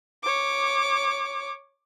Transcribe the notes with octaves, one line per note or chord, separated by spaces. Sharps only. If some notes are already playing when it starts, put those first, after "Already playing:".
C#5 D6